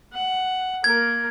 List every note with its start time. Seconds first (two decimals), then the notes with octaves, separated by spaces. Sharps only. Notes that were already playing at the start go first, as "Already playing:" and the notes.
0.13 F#5
0.84 A#3 A#4 G#6